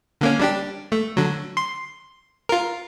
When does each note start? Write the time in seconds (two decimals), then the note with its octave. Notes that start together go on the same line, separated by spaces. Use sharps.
0.21 D3 A#3 C#4
0.40 G3 D4 G4
0.92 A3
1.17 D3 F#3
1.57 C6
2.49 F4 A#4